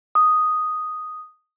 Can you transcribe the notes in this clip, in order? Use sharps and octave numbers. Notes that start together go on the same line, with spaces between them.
D#6